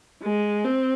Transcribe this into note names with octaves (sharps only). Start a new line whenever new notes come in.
G#3
C4